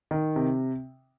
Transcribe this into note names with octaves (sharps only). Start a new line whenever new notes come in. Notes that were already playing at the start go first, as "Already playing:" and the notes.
D#3
C3